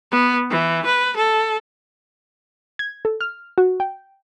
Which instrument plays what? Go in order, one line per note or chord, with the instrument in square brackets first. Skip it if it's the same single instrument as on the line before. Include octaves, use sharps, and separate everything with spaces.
[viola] B3
E3
B4
A4
[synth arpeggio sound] G#6
A4
F6
F#4
G5